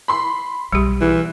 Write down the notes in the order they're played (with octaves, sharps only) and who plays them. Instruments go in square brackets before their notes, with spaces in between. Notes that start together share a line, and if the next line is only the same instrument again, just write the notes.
[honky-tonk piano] B5 C6
[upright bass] B1 [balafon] G3 G4
[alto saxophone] E3